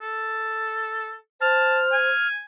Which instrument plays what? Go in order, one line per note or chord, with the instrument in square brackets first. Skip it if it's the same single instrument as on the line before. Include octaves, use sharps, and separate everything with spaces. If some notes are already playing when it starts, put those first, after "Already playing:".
[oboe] A4
[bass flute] C5 [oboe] A5 [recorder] F6
[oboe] G#5